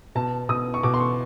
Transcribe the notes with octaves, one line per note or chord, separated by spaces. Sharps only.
B2 A5
B2 D#6
C#6
B2 D6
C6
C#6